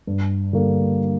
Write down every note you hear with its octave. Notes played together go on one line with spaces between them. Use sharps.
G2
D3 G3 A#3